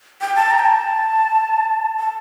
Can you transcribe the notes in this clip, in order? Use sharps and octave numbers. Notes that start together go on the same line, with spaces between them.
G5
A5
A#5
G5
A5
A5